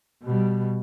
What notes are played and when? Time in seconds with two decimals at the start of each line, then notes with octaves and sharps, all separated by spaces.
0.24 B2 G3